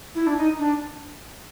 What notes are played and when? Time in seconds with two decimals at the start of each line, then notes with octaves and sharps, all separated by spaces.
0.15 E4
0.27 D4
0.37 D#4
0.59 D4